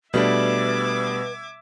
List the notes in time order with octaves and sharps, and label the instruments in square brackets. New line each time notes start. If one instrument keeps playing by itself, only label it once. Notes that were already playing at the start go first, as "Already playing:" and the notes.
[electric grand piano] B2 [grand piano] G3 A3 D4 [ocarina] B4 [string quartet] E5 D6 G#6